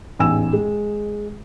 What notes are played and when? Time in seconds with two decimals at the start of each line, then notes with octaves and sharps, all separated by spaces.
0.19 A1 E2 G#2 G#5 E6 E7
0.53 G#3